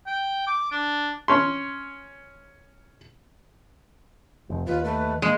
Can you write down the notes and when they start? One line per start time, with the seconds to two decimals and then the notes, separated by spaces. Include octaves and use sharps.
0.07 G5
0.47 D6
0.72 D4
1.28 C#4 C6
4.50 F1
4.67 D#2 F4 B4
4.84 A3 B4
5.22 G#3 A#3 G#5